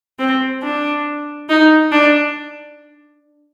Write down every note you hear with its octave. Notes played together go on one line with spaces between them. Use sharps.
C4
D4
D#4
D4